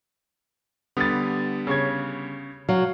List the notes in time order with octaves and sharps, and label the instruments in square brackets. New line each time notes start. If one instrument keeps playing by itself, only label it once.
[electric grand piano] D3 G3 B3 [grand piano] D#6 A6
[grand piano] C#3 C#5 G#6
[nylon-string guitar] F#3 [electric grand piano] F5